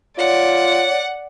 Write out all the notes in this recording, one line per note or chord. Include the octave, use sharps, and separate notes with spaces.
F4 C#5 D5 F#5